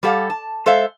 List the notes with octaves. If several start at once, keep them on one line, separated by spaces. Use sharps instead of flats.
G3 G4 A4 F5 F#5
A5
G#3 A4 C5 E5 F5